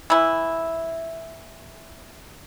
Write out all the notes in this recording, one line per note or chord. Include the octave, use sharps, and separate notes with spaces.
E3 E4